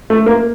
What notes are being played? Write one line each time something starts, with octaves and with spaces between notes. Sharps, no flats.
A3
A#3